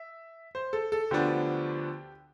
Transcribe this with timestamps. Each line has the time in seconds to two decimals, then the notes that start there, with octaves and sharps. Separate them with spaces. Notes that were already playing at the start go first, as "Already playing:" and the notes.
Already playing: E5
0.55 C5
0.73 A4
0.92 A4
1.11 D2 D3 F3 B3 D4 G4